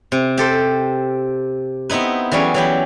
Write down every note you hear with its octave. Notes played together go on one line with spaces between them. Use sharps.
C3
G4 A4 C5
B3 C4 D#4 E4 B4
E3 F#3 G3 C#4 G#4
E3 F#3 G4